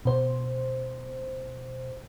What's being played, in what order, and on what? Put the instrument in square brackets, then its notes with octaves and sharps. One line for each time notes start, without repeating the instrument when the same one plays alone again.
[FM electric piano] B2 C5